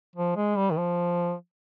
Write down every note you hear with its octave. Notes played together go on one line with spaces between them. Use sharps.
F3
G#3
G3
D#3
F3